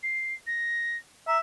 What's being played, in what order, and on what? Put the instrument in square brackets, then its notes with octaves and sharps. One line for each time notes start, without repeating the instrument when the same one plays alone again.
[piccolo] C7
A#6
[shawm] E5 [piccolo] A#5